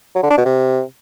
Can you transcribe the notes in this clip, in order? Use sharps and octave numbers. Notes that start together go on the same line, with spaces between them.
F#3
D3
D4
B2
C3